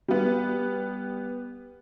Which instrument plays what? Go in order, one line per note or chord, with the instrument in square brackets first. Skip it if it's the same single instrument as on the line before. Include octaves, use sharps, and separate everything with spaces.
[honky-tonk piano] G3 B3